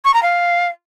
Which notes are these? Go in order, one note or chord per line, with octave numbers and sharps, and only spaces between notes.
C#6
A#5
F5